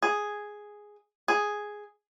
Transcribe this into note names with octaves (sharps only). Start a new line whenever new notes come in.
G#4
G#4